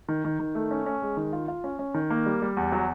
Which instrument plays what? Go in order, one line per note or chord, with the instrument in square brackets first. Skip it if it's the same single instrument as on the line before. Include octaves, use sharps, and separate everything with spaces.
[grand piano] D#3
D#3
D#3
A3
C#4
C#4
G#3
D#3
F4
F4
C#4
C#4
D#3
A#3
G3
G3
E2
F#3